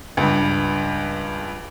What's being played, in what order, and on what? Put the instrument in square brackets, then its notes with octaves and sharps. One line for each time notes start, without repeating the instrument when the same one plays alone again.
[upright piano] C#2 G2